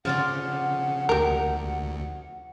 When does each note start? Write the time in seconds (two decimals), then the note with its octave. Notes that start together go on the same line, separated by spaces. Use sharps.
0.05 C#3 F3 F4 D5 F#5
1.09 D2 G4 A#4